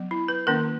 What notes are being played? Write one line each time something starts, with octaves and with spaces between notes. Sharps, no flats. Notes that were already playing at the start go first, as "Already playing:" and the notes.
Already playing: F#3 B3
E4
B4
D#3 A#3 C#4 A#4